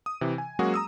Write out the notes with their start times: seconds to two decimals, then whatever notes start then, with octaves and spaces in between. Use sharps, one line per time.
0.06 D#6
0.21 C3 E3
0.38 G#5
0.59 F#3 G#3 A#3 C#4 F#4 G#4
0.74 A#5 D#6 E6